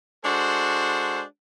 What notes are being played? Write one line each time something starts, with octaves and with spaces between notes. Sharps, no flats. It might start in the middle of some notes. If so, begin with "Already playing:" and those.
G#3 D4 F#4 A4 C5